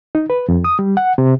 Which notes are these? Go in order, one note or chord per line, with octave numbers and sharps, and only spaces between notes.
D#4
B4
F2
D#6
G3
F#5
C3